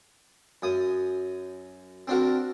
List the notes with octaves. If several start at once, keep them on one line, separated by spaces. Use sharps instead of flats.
F#2 D#6
C4 D4 F#4 A#4